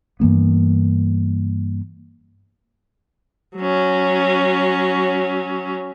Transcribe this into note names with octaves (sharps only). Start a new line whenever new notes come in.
G2 E3 A#3 B3
F#3 C#4